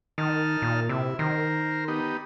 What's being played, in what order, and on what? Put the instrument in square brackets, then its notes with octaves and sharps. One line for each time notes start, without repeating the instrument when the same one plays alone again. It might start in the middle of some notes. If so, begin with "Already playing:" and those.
[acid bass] D#3 [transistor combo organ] D#4 A5 F6
[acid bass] A#2
[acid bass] C3 [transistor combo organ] E4
[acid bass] D#3 [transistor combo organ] A#4 C5
[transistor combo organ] B3 D#4 G4